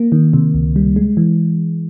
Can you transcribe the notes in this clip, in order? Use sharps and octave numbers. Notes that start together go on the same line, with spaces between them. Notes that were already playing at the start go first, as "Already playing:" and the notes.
Already playing: A#3
D#3
C3
C#2
G3
G#3
E3